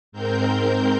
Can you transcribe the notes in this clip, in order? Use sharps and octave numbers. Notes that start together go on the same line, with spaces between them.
G#2 C4 A#4 G6